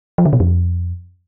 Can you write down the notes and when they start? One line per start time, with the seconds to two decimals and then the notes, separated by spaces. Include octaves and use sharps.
0.18 F3
0.26 D3
0.33 B2
0.40 F2